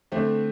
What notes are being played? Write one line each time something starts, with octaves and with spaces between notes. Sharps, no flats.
D3 A3 C4